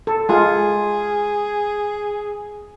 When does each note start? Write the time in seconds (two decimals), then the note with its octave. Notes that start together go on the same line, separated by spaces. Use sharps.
0.07 A4
0.29 G#3 F4 G#4